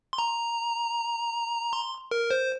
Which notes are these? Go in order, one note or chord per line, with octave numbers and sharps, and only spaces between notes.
C6
A#5
C6
A#4
C5